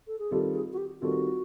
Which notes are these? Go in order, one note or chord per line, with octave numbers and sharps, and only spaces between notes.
A4
G#4
D#3 G3 C4 F4 G4 A4
G#4
F#4
G4
D#3 G3 C4 F4 F#4 A4